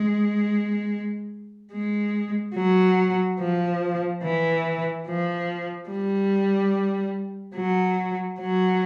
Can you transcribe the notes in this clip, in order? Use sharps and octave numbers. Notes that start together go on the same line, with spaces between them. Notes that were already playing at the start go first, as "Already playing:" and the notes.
Already playing: G#3
G#3
F#3
F3
E3
F3
G3
F#3
F#3